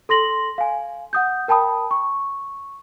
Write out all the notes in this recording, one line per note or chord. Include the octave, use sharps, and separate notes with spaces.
A4 C6 A#6 F#7
F5 G#5
F#5 D#6 G6
A#4 G5 A5 B5 D#6
C#6